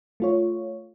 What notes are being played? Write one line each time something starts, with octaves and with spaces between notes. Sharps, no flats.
A3 F4 C#5